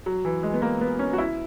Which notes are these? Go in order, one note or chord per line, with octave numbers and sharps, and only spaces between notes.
F#3
E3
G#3
B3
A#3
B3
C#4
F#4
E4